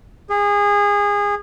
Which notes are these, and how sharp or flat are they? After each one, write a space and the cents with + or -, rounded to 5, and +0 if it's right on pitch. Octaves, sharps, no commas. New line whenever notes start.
G#4 -25